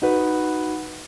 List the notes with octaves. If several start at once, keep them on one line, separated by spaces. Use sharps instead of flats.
D#4 F#4 B4